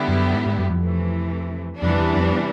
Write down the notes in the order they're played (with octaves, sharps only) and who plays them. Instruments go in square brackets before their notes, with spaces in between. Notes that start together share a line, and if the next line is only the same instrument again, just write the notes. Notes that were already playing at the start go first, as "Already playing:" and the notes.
Already playing: [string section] D3 G3 B3 E4 G4
[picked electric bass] F#2
G#2
G#2
F#2
F2
[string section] C3 E3 A3
[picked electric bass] F2 [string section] C3 E3 G3 B3 D4
[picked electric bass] E2
F2